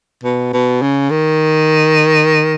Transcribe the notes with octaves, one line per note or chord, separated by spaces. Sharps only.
B2
B2
C#3
D#3